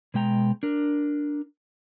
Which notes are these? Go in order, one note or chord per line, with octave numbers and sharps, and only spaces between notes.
B2 G#3 G5 A#5
D4 A#4